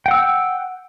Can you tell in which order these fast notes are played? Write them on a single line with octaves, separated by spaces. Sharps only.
G5 F#5 E6